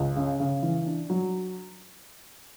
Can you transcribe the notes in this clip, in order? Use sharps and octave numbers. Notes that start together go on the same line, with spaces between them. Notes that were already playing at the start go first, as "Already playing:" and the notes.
Already playing: C#2
C#3
C#3
E3
D4
F#3